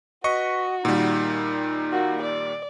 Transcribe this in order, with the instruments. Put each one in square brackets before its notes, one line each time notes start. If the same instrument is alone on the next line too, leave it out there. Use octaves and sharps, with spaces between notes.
[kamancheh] F#4 [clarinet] B4 [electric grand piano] D#5 C#6 C#7
[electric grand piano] A#2 D#3 G3 [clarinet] D#4
[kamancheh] A#3 F#4
D5